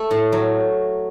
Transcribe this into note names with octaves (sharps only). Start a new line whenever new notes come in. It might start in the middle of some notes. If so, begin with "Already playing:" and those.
Already playing: A3 E5
A2
F#3